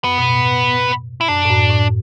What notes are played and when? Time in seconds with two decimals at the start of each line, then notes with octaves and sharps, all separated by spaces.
0.04 F#2 B3
0.18 B2
0.25 A2
1.21 E4
1.28 F#2 D4
1.45 A2
1.50 F#2
1.70 A2